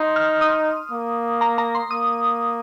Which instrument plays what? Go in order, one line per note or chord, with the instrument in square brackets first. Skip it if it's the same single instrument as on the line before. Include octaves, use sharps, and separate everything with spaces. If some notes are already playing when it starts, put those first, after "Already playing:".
Already playing: [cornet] D#4 [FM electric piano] C6
[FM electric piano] F6
D#6
[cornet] A#3
[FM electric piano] A#5
A#5
C6
[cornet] A#3 [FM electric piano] D#6